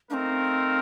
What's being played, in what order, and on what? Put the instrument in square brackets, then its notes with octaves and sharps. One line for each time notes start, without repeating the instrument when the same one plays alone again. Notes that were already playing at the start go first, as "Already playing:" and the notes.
[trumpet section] A3 D#4 A#4 F5 [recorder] C4 D4